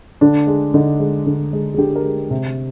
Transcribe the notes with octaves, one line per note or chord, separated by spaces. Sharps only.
D3 D4
G#3
D3 D#4
G#3
D3
G#3
G#4
D3 G4
A#4
G#3
C3